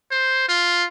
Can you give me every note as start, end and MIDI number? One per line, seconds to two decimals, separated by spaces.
0.11 0.48 72
0.49 0.86 65